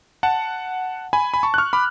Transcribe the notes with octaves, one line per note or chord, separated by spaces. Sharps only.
F#5 A5
G#5 B5
B5
A5 C#6
F#6
C#6 F6
B5 D6